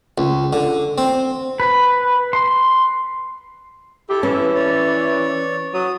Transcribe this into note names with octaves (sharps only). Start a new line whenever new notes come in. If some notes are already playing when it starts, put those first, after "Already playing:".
C#2
D3
C4
B4
C6
E4 G4 A4 E5
E3 C#4
C#5 D5
F#3 D#6